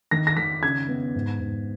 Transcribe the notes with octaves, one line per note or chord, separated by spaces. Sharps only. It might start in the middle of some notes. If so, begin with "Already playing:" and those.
D#3 A#6
A#6
D#3 B6
C#3 G#6
B3
G#2
G#2